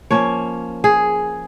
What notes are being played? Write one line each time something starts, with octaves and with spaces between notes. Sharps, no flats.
F3 A#3 C#4 C#5
G#4